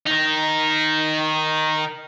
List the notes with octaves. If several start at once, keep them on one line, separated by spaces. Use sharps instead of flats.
D#3 D#4